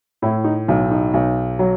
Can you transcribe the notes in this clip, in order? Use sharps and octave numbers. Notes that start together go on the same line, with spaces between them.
A2 E4
D#4
B1 D#4
D#4
B1
F#3